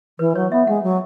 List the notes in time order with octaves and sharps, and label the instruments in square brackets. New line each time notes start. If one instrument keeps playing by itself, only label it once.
[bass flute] E3 [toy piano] B4
[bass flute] F#3 [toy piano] C#5
[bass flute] B3 [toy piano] E5
[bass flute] G#3 [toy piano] F#5
[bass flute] F#3